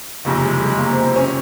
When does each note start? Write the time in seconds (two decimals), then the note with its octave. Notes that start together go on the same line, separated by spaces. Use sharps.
0.25 F#1 F2 C3 D#3 A#3
0.45 G#3
0.65 G#3
0.79 A#3
0.91 C4
1.04 C4
1.16 C#4